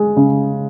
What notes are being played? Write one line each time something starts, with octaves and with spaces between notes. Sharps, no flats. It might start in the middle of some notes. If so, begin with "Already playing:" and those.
Already playing: G#3
C#3